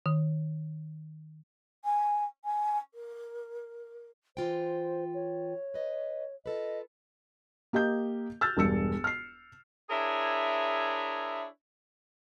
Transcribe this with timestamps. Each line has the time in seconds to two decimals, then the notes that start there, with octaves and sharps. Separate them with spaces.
0.06 D#3
1.85 G#5
2.45 G#5
2.94 A#4
4.37 E3 F4 C5 G5
5.14 C#5
5.74 B4 D#5
6.46 F4 A4 B4 D#5
7.73 A#3 G4 D#5 G6
8.41 E6 F6 G6 A6
8.57 E1 G2 E6 C#7
9.04 F6 C7
9.90 D4 E4 G#4 A#4 C#5 E5